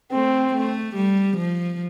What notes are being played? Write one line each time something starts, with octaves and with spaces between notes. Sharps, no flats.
A3 C4
A3
G3
F3